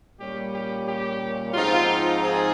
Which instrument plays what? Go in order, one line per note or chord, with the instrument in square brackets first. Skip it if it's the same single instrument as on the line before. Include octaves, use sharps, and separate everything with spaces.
[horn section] A#2 G3 C#4 G4
G4
G4
G#2 F3 C4 D#4 F4
F4 G#4